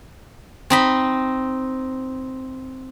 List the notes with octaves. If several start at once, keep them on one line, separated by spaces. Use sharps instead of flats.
C4 D#4 B5